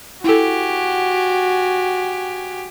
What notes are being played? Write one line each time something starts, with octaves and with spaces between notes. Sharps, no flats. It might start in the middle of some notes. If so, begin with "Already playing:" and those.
E4 F#4 G4 A4 G#5